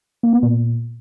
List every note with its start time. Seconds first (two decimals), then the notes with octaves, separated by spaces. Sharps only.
0.23 A#3
0.33 B3
0.43 A#2